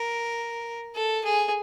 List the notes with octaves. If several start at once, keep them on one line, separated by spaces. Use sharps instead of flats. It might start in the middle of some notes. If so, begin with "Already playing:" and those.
Already playing: A#4
A4
G#4